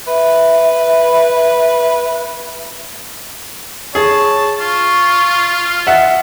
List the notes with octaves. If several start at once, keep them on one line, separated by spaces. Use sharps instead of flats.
B4 E5
G#4 C#5 A5
F4 C#6
D#5 E5 F#5